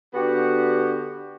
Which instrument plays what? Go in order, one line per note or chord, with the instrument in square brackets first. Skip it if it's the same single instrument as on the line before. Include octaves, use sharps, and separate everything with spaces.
[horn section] D3 B3 F#4 G4